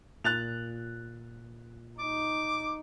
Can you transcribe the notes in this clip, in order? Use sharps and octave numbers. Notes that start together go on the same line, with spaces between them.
A#2 F#6 A6 F7
D#4 D6